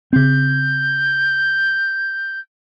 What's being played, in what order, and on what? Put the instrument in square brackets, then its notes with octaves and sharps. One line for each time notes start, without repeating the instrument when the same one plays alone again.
[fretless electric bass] C#3 C4 [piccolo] G6